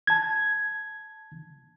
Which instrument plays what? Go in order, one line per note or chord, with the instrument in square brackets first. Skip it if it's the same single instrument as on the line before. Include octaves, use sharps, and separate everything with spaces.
[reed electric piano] A5 G#6